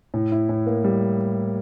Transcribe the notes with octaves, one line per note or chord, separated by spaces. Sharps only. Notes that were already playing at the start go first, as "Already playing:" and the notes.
A2
E4
A2
A#3
G3